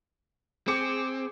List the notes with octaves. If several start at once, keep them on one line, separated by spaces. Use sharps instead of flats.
C4 G#4 D6 C#7